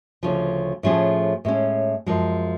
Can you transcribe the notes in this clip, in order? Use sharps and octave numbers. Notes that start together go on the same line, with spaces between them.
D2 C#3 F3
A2 F3 A3 C#4 G#4
A2 G#3 C#4
F#2 F3 G#3